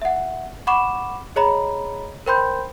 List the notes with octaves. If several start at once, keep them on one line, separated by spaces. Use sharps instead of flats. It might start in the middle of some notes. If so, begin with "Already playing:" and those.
E5 F#5
F#5 B5 C#6 D6 E7
G#4 C#5 D#5 A#5 B5
A#4 C5 G5 B5 C6 G6